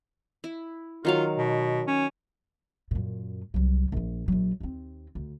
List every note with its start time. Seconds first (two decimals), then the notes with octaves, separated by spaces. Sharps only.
0.44 E4
1.05 D#3 F#3 F4 F5
1.38 B2
1.87 C#4
2.91 F#2 A#2
3.54 C2 F#3
3.92 A#1 F3
4.28 A#1 F#3
4.60 D#2 C4
5.15 D2